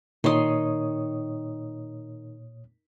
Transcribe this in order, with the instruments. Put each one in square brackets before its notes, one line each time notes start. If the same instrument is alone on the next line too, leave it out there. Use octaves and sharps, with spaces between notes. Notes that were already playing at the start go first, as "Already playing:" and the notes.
[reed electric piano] A#2 C#5 D#6 [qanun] D#3 C6